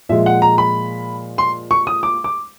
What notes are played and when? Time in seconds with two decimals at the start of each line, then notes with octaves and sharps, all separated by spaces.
0.09 A#2 F3 G#3 E5
0.26 F#5
0.42 A#5
0.58 B5
1.38 C6
1.71 C#6
1.87 D#6
2.03 D6
2.24 D6